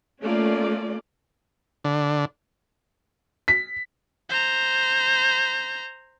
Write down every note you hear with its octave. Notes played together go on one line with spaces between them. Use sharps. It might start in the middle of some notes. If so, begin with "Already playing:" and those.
A3 A#3 C#4 F4 D5
D3
B6
C5 A#5